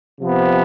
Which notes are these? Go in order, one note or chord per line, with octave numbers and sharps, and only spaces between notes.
C3 F3 B3